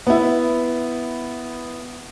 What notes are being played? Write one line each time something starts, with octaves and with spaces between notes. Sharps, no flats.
B3 E4